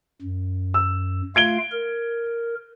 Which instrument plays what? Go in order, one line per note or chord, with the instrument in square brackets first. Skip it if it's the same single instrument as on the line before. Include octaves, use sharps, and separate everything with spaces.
[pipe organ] F#2
[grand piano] E6
[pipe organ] A3 F4 F5 [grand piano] G#6 D7 G7
[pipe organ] A#4